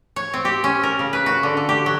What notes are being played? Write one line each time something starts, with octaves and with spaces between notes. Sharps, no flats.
C#5
C4
G4
C#4
A#4
C#3
B4
F#4
D3
D3
G4
F#3